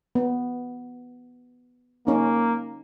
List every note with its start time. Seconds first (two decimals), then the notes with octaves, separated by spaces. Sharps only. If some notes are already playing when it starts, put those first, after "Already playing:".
0.15 B3
2.07 A#3 C#4 D#4